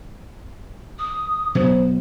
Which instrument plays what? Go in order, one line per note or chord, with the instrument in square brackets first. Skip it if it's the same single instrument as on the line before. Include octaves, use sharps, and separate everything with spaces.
[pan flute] D#6
[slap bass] B2 F#3 B3 [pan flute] C5